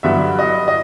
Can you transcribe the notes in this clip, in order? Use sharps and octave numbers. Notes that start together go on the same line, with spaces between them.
G2 D3 F#3 B3 E5
D#5
D#5